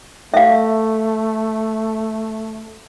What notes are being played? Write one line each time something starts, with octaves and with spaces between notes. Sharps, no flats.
A3 E5 F5